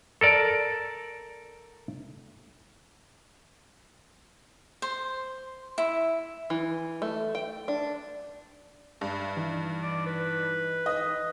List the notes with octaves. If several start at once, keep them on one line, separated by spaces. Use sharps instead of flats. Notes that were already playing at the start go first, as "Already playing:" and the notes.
A4 A#4 D5
C5
E4
E3
A3
G5
D4
G2 E5
E3 D#4
D5
B4
D#5